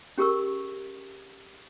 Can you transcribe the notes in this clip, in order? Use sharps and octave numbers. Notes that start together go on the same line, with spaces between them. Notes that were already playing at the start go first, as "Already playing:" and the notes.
C#4 G4 G#4 A#4 C#6 E6